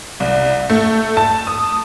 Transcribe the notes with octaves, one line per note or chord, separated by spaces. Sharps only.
C2
A3
A5
D#6